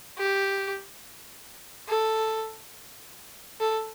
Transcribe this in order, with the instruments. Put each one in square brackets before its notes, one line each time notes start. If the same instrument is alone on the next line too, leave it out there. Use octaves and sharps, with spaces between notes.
[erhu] G4
A4
A4